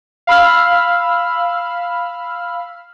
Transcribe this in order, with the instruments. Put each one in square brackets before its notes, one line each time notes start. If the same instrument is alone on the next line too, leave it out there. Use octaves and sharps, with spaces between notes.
[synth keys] F5 B5 E6 F6